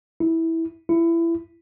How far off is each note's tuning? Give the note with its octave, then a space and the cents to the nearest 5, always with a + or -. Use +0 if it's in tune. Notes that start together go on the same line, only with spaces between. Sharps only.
E4 -15
E4 +20